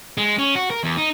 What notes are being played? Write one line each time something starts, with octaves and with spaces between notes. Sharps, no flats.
G#3
C#4
F#4
A#4
E2
D#4